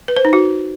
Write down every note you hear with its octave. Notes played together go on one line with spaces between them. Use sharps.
B4
C5
D#4
F#4